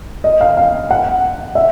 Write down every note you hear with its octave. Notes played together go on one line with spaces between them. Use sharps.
D#5
F5
F5
F#5
E5